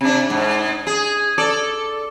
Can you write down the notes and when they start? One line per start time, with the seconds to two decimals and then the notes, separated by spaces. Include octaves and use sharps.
0.01 C3 D4
0.30 G#2
0.87 G#4
1.38 A4 D5